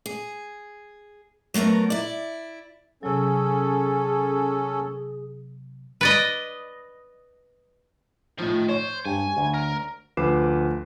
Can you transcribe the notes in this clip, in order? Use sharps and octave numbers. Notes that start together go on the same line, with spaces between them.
G#4
F#3 A3 B3 A#4 A#5
E4 D5
C3 F#3 C#4 G#4 A4
B4 D5 D#5
A2 D#3 F3
C5 C#5
G2 G#5
D2
A#4
D2 F3 B4 D6 C7 E7